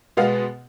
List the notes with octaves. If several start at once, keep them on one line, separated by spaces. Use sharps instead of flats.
B2 G#3 B3 F5